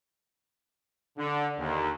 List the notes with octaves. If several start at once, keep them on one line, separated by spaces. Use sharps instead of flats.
D3
D#2